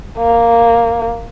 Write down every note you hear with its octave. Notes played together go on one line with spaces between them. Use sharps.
A#3